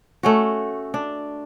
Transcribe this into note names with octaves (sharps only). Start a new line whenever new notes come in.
A3 C#4 F#4
D4